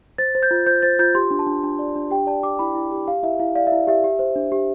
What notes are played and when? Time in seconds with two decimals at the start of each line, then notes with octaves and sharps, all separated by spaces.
0.18 C5 A6
0.35 C5
0.43 G6
0.51 F4
0.67 C5 G6
0.82 C5 A6
0.99 F4 G6
1.15 G4 C6
1.31 D4
1.39 A5
1.47 D4
1.63 D4
1.79 D5
1.95 D4
2.11 G4 G5
2.27 D5 A5
2.43 G4 D6
2.59 E4 B5
2.75 E4
2.92 G4
3.08 G4 F5
3.23 E4 E5
3.39 E4 F5
3.55 D5 F5
3.67 E5
3.72 E4
3.87 G4 E5
4.04 G4
4.19 C5
4.35 D4
4.52 G4